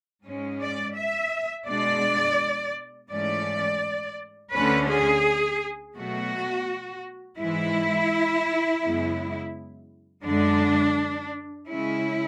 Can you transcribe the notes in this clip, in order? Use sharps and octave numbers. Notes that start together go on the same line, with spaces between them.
G#2 G#3 C#4
D5
E5
B2 G#3 D4 D5
G#2 E3 A3 C#4 D5
D2 D3 A3 C#4 B4
G#4
B2 F#3 A3 F#4
G#2 E3 G#3 E4
F#2 C#3 G#3 B3
F#2 D3 G#3 D4
C#3 G#3 C#4 E4